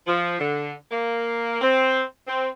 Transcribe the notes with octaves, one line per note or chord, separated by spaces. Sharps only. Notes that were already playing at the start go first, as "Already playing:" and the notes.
F3
D3
A#3
C4
C4